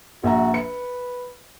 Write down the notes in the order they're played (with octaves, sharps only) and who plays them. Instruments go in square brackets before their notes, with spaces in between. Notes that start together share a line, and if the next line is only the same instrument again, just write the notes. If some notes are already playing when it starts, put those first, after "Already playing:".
[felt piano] A#1 E5 A#5 [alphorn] F#4
[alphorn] B4 [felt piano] C#7